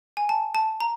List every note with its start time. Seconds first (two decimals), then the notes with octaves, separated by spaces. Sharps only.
0.17 G#5
0.29 A5
0.55 A5
0.80 A#5